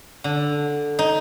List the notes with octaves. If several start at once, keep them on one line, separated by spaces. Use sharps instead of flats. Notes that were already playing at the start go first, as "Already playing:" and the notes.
D3
D#4